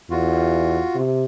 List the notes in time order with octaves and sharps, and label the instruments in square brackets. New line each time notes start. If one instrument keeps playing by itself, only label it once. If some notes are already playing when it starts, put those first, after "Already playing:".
[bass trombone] E2 [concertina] F4 F#4
[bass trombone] C3